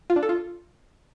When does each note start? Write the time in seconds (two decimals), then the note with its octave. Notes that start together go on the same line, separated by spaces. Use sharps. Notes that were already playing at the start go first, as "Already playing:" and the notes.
0.10 F4
0.16 D4
0.23 A4
0.29 F4